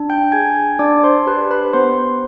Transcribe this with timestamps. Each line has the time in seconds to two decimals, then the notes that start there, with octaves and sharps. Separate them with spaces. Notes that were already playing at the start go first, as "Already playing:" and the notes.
Already playing: D4
0.10 G5 G6
0.32 G#4 G#5 G#6
0.79 D4 D5 D6
1.04 C5 C6
1.26 G4 B4 B5
1.51 B4 B5
1.73 B3 C5 C6